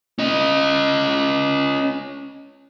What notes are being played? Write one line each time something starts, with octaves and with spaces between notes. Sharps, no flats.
C#4 D#5